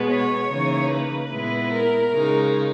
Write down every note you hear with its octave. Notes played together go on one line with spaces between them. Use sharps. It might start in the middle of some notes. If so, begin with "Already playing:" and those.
Already playing: B2 G#3 B3
C#5
C#3 E3 A#3 D#4
B4
A#2 G#3 B3 E4
A#4
C#3 G#3 D#4